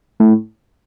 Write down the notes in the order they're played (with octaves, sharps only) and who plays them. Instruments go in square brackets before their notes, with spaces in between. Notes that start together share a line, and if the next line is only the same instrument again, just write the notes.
[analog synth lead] A2